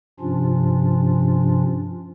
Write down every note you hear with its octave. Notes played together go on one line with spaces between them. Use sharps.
G2 C3 F3 C#4 D4 F4